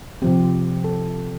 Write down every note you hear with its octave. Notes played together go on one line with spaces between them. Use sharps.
C3 F3 C4 G4
A4